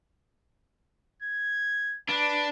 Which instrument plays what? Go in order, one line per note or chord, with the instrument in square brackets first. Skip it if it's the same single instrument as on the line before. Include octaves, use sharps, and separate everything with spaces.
[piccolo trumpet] G#6
[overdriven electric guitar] D4 [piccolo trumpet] B4